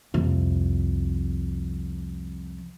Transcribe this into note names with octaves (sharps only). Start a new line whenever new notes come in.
C2 F2